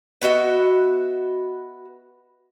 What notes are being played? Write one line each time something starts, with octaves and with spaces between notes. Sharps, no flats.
B3 F#4 D#5 E5